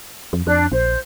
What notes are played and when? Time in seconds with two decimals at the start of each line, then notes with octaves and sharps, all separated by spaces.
0.33 F2
0.47 F2 D4 F#6
0.72 A#1 C5